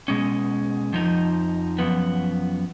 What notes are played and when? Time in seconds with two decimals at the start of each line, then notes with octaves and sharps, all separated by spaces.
0.08 B2 G#3 C#4
0.93 F2 F3 D#4
1.78 F#2 F3 B3